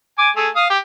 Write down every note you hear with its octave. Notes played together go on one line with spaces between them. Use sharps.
G#5 D6
A3 G#4
F5 D#6
G4